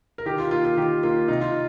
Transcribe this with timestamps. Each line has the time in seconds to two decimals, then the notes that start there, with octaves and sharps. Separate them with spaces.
0.18 A#4
0.26 D#3 G4
0.38 F4
0.51 A#3 F4
0.65 F4
0.77 D#3 G4
1.03 A#3 F4
1.28 C3 D#4
1.42 F4